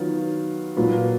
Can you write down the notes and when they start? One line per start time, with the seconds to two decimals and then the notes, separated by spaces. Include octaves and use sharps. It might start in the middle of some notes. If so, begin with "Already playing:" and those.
Already playing: D#3 F#3 B3 F4
0.77 A#2 F#3 A#3 F4 B4